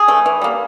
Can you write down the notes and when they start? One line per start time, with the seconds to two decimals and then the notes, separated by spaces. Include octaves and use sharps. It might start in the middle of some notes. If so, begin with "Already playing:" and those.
Already playing: G#4
0.08 E3 A3
0.26 E3
0.42 G3 A#3